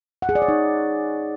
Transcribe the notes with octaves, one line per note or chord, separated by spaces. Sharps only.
F#5
G#4
D5
C#5
D#4